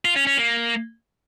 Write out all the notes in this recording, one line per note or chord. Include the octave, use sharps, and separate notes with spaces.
F4
C#4
C#4
A#3